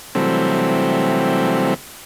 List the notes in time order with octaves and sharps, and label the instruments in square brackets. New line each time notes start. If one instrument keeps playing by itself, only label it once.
[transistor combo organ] C3 E3 F#3 G3 A3 C4